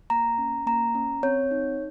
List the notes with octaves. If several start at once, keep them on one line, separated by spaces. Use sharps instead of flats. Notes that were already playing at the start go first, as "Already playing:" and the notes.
A#3 A#5
C#4
A#3 A#5
C#4
C4 C#5
D#4